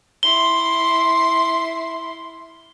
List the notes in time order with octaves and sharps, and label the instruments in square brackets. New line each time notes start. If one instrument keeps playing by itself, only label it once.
[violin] E4 C6 [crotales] G7